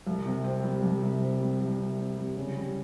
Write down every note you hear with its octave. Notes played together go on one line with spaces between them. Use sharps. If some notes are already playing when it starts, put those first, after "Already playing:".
C2
C3
C4
G3
C2
C3
C4
G3
C2
C3
C4
G3
C#3
G3